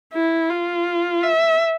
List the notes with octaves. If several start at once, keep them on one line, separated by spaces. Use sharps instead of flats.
E4
F4
E5